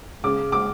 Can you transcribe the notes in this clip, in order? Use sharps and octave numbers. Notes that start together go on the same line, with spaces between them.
C#3 D6
D6